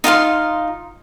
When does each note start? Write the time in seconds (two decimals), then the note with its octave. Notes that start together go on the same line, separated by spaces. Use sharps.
0.04 D#4 F4 F5 C6